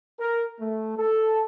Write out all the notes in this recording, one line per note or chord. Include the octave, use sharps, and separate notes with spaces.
A#4
A3
A4